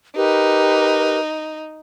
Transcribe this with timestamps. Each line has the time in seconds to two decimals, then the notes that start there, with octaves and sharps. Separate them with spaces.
0.16 D#4 G4 A#4 B4